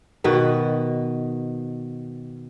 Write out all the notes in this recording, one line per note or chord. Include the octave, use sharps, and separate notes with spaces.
B2 D#3 B4